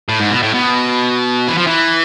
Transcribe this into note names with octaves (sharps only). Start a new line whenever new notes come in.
A2
G#2
B2
A2
B2
E3
F3
E3